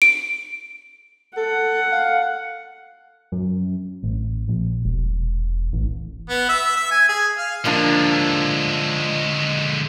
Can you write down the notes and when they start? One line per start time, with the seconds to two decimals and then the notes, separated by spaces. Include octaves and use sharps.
0.02 D7
1.37 A4 F#5
1.92 F5
3.32 F#2
4.03 A1
4.48 A#1
4.84 E1
5.73 A1
6.30 B3
6.49 E5
6.76 E5
6.91 G#5
7.09 G#4
7.38 F5
7.65 D3 F3 G#3 A#3 D4